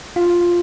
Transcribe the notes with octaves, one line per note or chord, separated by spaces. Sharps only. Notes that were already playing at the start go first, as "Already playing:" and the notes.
F4